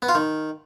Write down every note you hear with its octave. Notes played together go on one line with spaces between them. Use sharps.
B3
F4
D#3